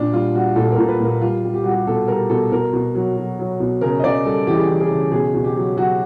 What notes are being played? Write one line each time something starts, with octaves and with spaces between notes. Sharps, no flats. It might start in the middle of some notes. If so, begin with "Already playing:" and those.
Already playing: A#2 D4
G3 F4
G3 F#4
A#2 A4
A#4
A#2
B4
A#2 A#4
G3 F4
G3
G4
G3 F#4
G4
B2 A4
G3 A#4
B2 A4
B2 A#4
B2
F#3
F#3
F#3
B2
C#3 A#4
D#5
C#3 D5
G3 A4
E3 G4
G#4
G4
E3
G#4
C#3
B2 G#4
B2
G4
F#3
F#3 F#4